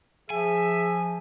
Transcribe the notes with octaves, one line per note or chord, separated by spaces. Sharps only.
F3 G#4 E5 G#5